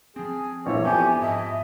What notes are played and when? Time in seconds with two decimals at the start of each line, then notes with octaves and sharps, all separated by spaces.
0.16 F3 C4 G#4
0.66 A#1 E3 C#5 E5
0.85 F2 B3 G4 G#5
1.22 G#2 D#5 E5